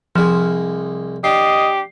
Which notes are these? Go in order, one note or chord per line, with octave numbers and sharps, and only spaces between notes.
C2 F3 G#3
D4 G4 D#5 C7